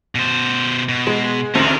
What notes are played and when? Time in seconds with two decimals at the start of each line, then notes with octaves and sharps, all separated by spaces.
0.15 B2 C5
0.89 B2
1.07 G#3
1.55 A1 D2 C4 D#4 A#4